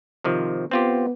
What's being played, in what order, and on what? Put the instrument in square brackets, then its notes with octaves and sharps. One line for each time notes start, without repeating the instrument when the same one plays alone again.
[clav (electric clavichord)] C3 D#3 F3
[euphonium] B3 [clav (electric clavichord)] C4 F4 G4